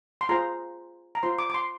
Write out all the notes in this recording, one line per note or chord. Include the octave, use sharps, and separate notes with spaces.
C6
F4 G#4 C5 A#5
A#5
F4 C5 C6
D6
D6
C6